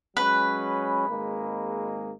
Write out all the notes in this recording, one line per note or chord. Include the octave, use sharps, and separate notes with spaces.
F#3 G#3 C#4 B4
G#1 G#3 A#3